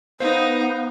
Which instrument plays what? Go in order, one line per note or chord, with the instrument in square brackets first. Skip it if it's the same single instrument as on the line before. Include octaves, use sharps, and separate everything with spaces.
[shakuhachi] B3 [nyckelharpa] D#4 [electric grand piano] C5 [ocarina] F5